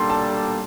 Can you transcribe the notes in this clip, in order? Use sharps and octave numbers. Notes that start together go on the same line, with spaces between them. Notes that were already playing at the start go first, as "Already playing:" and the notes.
Already playing: G3 A#3 D4 A4 C6
A5